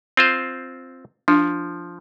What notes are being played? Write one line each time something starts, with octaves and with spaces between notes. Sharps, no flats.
C4 F4 C5
F3 D4